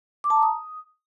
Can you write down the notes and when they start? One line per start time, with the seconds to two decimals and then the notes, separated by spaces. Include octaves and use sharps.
0.24 D6
0.30 A5
0.36 A#5
0.43 D#6